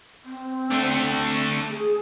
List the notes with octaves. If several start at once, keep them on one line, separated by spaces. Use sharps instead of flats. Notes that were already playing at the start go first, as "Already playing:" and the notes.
C4
A3 D4
G#4